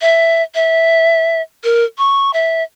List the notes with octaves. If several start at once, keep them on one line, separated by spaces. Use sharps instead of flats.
E5
E5
A#4
C#6
E5